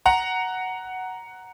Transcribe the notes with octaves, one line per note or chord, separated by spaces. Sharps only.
F#5 A#5